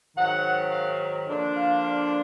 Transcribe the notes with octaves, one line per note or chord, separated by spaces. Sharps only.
G#2 D#3 F#3 F#5
F5
D3 F3 A#3 D4
F5
F5